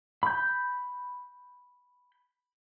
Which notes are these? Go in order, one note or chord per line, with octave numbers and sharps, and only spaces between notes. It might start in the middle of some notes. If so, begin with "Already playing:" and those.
B5 G6